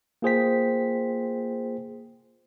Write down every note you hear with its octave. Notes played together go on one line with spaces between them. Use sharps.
A#3 F4 G#4 C5 G5 B6